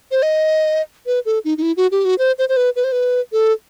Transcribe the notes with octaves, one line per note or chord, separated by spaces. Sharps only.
C5
D#5
B4
A4
D#4
D#4
E4
F#4
G4
F#4
C5
C5
C5
B4
B4
C5
B4
A4